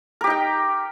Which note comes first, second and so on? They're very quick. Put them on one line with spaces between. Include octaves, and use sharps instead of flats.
A#4 G4 D#4 G5